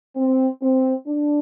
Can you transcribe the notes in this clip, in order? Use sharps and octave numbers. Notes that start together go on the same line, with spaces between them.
C4
C4
D4